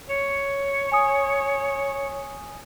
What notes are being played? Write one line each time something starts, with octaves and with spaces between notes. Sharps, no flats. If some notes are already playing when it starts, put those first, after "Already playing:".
C#5
G#5 D#6